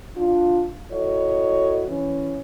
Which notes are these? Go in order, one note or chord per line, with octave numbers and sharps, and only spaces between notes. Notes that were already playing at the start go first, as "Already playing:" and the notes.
D4 F4
E4 F#4 A4 C#5 D#5
E3 C#4